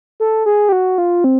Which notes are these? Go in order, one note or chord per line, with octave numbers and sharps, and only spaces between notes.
A4
G#4
G4
F#4
F4
C4